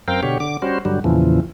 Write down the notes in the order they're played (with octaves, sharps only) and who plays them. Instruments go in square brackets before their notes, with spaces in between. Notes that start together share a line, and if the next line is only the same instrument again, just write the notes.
[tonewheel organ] F#2 C4 A#4 F5 G5
B2 D3 G4 C#5
D3 D6
G3 C#4 F#4 C5
G2 D3 F#3 G3
E2 A#2 C#3 E3 F3